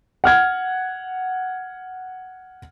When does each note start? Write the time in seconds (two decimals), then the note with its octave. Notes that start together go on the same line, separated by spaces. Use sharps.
0.24 F#5 F6 G#6